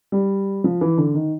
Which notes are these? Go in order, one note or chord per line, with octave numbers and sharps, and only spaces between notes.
G3
F3
E3
D3
D#3